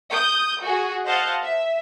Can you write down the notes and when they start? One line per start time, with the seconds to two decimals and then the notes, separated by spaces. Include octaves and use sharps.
0.11 D#6 G6
0.61 F#4 G#4
1.05 C5 D#5 F5 F#5 A5
1.42 E5